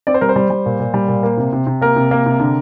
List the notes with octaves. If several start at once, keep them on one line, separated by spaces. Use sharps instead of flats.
C4 D5
C5
G3 A#4
C5
G3
G3
A#2
A#2
G3
A#2
A#3
C3
C3
C3
A#3 A#4
C3
A#3
C3
D3